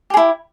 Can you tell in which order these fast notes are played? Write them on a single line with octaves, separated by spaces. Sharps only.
G4 G#4 E4